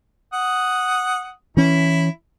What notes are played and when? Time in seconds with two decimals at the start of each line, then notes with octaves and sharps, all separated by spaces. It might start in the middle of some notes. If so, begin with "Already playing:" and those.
0.33 F#5 D#6
1.57 E3 C#4 E4